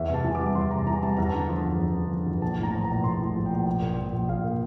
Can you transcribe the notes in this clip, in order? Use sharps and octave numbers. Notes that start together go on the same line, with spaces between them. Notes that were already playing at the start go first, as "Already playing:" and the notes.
Already playing: E2 E5
C3 A5
E3
G3 D6
E2 C6
C3 A#5
E3 A#5
G3 A5
E2 A#5
D3 A5
F3
E2
E2
D3
F3
E2
A#1 A5
A2 A#5
F3
A#5
A#1
A#1 C6
A2
F3
A#1 G5
A#1
A#2
F3
A#1
A#1 F5
A#2